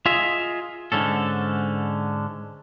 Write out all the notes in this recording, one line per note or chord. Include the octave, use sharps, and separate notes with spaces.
F4 G#4 D#5 E5
G#2 D3 C#4 A4